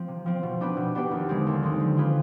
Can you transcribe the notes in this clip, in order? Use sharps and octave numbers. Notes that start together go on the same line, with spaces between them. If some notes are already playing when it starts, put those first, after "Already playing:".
Already playing: F3 C4
C3
F3 C4
B2
B3 D4 G4 B4
B2
B3 D4 G4 B4
D#2
D3 G#3 C4
D#2
D3 G#3 C4
F3
C4 F4 G#4 B4